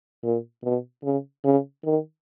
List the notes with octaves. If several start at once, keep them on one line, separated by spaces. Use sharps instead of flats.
A#2
B2
C#3
C#3
D#3